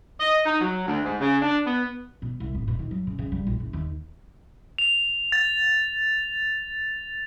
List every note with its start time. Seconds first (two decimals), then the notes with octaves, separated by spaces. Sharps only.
0.20 D#5
0.46 D#4
0.59 F#3
0.86 D2
1.04 G#2
1.20 C#3
1.42 D4
1.66 B3
2.22 B2
2.40 C2
2.55 D1
2.68 B2
2.79 D#3
2.91 F#3
3.07 C#3
3.19 C#3
3.32 G3
3.47 A#1
3.60 F#1
3.73 D#2
4.78 F7
5.32 A6